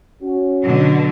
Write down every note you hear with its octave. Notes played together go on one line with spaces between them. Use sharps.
C#4 F#4
B2 D3 F#3